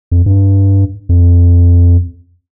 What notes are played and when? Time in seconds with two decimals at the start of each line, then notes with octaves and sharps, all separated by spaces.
0.12 F2
0.26 G2
1.09 F2